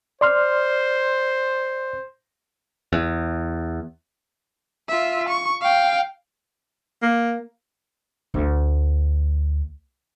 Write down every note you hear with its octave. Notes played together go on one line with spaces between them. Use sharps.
C5 D5 C6 F6
E2
F4 E5
C#6
F5 G5
A#3
D2 A3